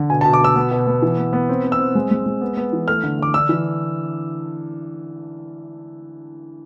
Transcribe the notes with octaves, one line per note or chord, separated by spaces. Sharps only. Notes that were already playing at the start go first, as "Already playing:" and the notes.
Already playing: D3
B2 G#5
A5
B2
D6
B2 E6
B3
B2
B3
E3
B3
B3
C4
C4
E6
C4
G#3
G#3
G#3
B3
B3
E3
A3 F6
D3
D3 D6
D4 E6
E3